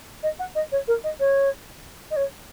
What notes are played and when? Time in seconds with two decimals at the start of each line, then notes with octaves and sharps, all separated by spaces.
0.23 D#5
0.39 F#5
0.55 D#5
0.72 C#5
0.88 A#4
1.04 D#5
1.20 C#5
2.11 D#5
2.16 C#5